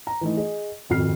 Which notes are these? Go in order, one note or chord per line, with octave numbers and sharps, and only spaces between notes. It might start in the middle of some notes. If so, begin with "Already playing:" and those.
A#5
E3 A3 D#4
G#4 D#5
D#1 G#1 F2 F#4 F6 C7